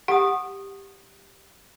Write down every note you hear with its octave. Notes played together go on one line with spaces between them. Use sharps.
G4 F#5 D#6